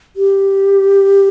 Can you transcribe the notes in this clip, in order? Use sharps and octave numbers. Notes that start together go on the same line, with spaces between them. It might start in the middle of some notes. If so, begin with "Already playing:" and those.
G4